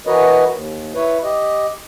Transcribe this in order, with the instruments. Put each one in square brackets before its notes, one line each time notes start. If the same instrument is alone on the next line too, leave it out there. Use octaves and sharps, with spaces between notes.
[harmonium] E3 F#4 A#4 B4 C#5 D#5
D#2
E4 B4 C#5
G4 D#5